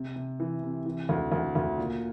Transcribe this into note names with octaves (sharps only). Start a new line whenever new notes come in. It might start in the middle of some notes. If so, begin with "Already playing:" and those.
Already playing: C3
C3
E3
C3
E3
D2
D2
D2
A#2